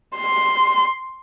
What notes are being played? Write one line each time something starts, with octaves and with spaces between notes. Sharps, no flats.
C6